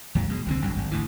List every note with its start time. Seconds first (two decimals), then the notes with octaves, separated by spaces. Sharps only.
0.15 D#2 G#2 F#3
0.29 B2 G#3
0.46 C2 D3 C4
0.62 G#1 D2 G2 F#3
0.76 G#1
0.91 D2 G#2 E3